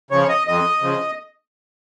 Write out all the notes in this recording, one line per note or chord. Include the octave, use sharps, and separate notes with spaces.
C#3 F3 C#5
D#5
F2 D#5
C#3 F3